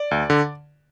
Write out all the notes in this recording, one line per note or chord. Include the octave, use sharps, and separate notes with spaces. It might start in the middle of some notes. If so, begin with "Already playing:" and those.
Already playing: D5
D2
D3